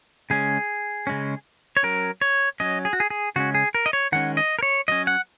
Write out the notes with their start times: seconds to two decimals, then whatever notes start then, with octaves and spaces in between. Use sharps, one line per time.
0.30 C#3 G#3 C#4 G#4
1.07 C#3 G#3 C#4
1.77 C#5
1.83 F#3 C#4 A#4
2.21 C#5
2.60 F#3 C#4 D#5
2.85 G#4
2.93 F#4
3.00 G#4
3.10 G#4
3.36 C#3 G#3 C#4 F#4
3.55 G#4
3.75 A#4
3.86 D#5
3.93 C#5
4.12 D#3 G#3 C#4 F#5
4.37 D#5
4.59 A#4
4.63 C#5
4.88 F#3 C#4 D#5
5.07 F#5